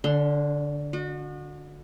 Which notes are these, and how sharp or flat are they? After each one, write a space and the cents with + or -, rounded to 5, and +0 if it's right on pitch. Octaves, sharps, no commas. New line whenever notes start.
D3 -5 C#4 +45 C6 +5
F#4 -30 D#5 -45